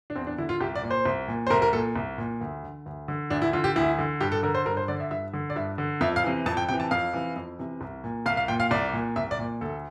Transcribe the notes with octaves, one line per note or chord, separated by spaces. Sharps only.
D4
E2 C4
D4
D3 E4
F4
C2 G4
D5
A#2
C5
C2
A#2
C5
C2 A#4
A#4
A#2 A4
C2
A#2
D2
D3
D2
D3
D2 D4
E4
D3 F4
G4
D2 E4
D3
G2 G4
A4
D3 A#4
C5
G2 A#4
C5
D3 D5
E5
G2 E5
D3
D5
G2 E5
D3
F2 E5
F5
C3 E3
F2 A5
G5
C3 E3 G5
A5
F2 F5
C3 E3
F2
C3 E3
C2
A#2
C2 F5
F5
A#2 G5
F5
C2 D5
A#2
C2 E5
D5
A#2
D2 A4